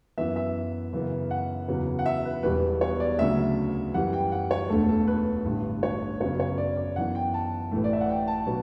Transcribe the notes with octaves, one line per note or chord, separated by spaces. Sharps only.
F#2 E3 B3 E5
E5
F#2 C#3 E3 B3
F#5
E2 C#3 F#3 B3
F#5
E5
B4
E1 E2 B2 G3 B3 B4
C#5
D5
D2 C#3 F#3 E5
F#2 E3 G3 F#5
G5
F#5
C#5
E1 D2 D3 A3 A4
A4
B4
A1 G2 D3
C#5
F#2 C#3 F#3 B3 C#5
C#5
D5
D5
F#2 E3 B3 F#5
G5
A5
A1 A2 E3 A3
D5
E5
F#5
G5
A5
B2 F#3 B3